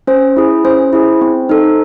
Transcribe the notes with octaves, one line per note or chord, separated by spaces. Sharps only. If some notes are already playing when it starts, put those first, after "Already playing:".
C#4 C5
E4 G#4
C#4 C5
E4 G#4
C4
D#4 A4